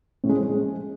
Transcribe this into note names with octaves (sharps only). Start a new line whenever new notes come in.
A2
G#3
C4
G#3